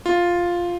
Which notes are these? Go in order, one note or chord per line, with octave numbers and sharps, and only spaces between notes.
F4